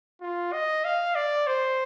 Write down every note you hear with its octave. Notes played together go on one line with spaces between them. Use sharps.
F4
D#5
F5
D5
C5